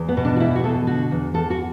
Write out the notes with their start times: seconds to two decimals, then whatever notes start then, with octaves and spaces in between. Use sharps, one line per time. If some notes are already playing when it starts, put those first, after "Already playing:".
Already playing: E2
0.09 B3
0.17 B2
0.25 D4
0.36 F#4
0.40 E2 E4
0.56 F#4
0.64 B2 A4
0.87 D3 F#4
1.11 E2
1.34 E2 A4
1.50 F#4